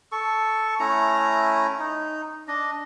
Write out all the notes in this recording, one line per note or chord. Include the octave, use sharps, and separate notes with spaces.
A4 C#6
A3 C#4 E4 A#5
D#4
D4 D#5